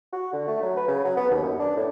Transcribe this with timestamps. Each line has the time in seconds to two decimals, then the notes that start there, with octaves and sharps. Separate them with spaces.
0.13 F#4
0.33 D3
0.47 A3
0.63 F#3
0.77 B4
0.88 C#3
1.05 F#3
1.17 B3
1.30 D#2
1.42 F#2
1.59 D4
1.77 A2